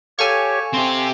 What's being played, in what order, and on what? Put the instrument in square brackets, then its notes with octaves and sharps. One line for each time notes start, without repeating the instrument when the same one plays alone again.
[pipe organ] G4 C#5 [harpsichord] A4 F5 [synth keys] G#5 C#6
[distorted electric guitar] C4 G4 [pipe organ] C6